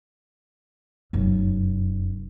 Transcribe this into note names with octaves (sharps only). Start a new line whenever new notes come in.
F1 F#2